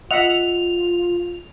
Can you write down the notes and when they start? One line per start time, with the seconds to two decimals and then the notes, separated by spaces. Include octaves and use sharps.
0.11 F4 D#5 E5 F#5 F7